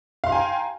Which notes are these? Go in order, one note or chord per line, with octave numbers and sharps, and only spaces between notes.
F5 G5 G#5 A#5 C6